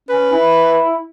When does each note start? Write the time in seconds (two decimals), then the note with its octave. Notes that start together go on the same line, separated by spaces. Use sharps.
0.09 C#4 B4
0.32 E4